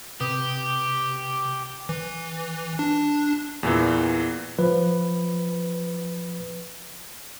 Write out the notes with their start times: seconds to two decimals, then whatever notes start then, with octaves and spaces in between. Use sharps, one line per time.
0.21 C3 G4 B4 D#6
1.89 E3
2.79 D4
3.63 E2 A#2 E3
4.59 F3 B4